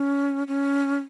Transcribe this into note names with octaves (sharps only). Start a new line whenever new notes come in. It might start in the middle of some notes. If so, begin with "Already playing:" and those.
Already playing: C#4
C#4